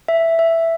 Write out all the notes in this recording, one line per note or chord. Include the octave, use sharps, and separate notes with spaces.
E5
E5